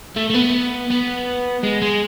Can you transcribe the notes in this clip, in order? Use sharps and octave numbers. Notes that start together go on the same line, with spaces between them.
A3
A3
B3
B3
G#3
G#3